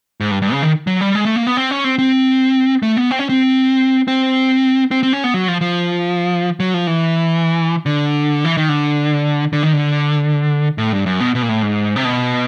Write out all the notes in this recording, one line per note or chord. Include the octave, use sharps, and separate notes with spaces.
G#2
G2
G2
C#3
D#3
F#3
G3
G#3
A3
A#3
B3
C4
C#4
C4
C4
A3
B3
C4
C#4
C4
C4
C4
C4
C#4
B3
F#3
F3
F3
F#3
F3
E3
D3
E3
D#3
D3
D3
D#3
D3
A2
G2
F#2
B2
B2
A#2
A2
G#2
C3
B2